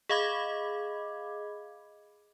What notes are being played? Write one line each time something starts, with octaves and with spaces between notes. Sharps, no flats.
G#4 D#5 F5 B5 D6 G#6